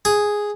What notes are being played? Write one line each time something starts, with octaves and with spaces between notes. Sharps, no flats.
G#4